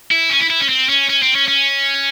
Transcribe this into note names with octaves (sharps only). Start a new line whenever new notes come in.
E4
C#4
E4
E4
C#4
C4
C#4
C#4
C4
C#4
C#4